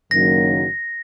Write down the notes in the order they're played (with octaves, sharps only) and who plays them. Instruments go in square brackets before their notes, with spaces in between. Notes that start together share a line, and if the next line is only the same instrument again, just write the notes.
[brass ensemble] F#1 F#2 D#3 F#3 A#3 [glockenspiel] A#6